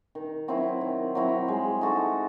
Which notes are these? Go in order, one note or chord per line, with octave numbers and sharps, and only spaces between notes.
D#3
F#3 C4 E4
D#3
F#3 C4 E4
G#3
D#4 F#4 A4